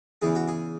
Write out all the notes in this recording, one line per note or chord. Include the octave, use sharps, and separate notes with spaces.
E2 C#3 E3 G#4
F#4
G#4